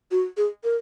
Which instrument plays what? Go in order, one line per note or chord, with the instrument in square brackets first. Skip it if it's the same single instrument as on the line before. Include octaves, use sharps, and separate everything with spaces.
[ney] F#4
G#4
A#4